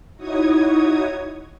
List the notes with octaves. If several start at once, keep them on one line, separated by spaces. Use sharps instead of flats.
D#4 E4 F#4 C#5 D#6 G#6